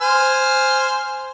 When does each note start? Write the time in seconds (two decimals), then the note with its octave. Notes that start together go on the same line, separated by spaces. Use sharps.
0.02 C5 G#5 F6